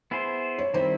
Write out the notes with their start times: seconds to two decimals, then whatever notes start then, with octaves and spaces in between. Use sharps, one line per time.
0.11 B3 E4 G#4 C5
0.59 C#5
0.74 D#3 G3 C4 E4 C5